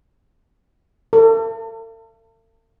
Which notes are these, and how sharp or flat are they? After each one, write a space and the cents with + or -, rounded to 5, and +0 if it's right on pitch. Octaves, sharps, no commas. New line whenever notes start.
A4 +45